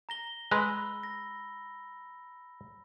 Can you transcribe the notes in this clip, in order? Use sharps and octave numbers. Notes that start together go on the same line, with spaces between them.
A#5 A#6 G7
G#3 B4 A#5 B5 E6
A#6